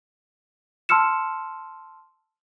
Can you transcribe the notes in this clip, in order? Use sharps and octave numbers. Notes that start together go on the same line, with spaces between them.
A5 C6 E6 F6 C#7 E7